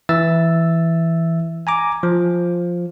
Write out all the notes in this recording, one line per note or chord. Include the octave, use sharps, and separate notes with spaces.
E3 E5 E6 A6
G#5 A#5 D6
F3